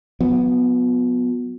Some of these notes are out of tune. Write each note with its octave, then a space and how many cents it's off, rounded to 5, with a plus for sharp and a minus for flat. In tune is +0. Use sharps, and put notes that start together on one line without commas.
F#3 -35 B3 +0